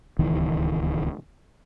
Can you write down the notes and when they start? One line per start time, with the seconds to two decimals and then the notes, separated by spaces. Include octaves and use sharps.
0.19 D1 C#2 D#3 E3